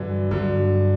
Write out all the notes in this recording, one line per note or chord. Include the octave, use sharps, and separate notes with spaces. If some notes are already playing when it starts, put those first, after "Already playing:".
Already playing: G2 D3 E3 F#3
G2 D3 F#3